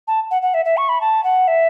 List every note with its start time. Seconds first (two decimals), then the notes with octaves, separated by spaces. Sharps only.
0.07 A5
0.31 F#5
0.42 F#5
0.54 E5
0.65 E5
0.77 C#6
0.89 B5
1.01 A5
1.24 F#5
1.47 E5